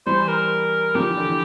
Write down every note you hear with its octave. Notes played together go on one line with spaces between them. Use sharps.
E3 G3 C5
A#4
D3 F3 G4
E3
D3
E3